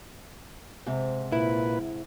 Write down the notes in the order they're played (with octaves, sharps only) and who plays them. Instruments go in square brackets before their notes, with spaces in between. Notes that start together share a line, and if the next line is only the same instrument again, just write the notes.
[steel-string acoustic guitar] G#2 C3
[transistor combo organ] A#2 B4 [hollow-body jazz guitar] E4